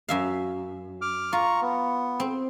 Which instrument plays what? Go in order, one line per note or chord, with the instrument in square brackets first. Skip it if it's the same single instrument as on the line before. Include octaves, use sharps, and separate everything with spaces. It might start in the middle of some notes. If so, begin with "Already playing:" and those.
[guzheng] F#2 E5 F5
[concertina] D6 F6
[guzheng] F4 [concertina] A#5 C#6
[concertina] B3
[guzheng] C4